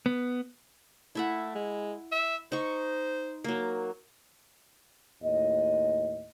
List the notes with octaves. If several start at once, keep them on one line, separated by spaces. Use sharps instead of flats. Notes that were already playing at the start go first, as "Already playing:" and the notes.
B3
A3 E4 E5 F#5
G#3
E5
D#4 C5 C#6
F#3 A#3
D#2 A2 D#5